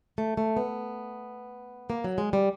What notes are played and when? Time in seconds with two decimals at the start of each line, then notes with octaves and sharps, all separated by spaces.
0.18 A3
0.37 A3
0.57 B3
1.90 A#3
2.04 F#3
2.18 G#3
2.33 G3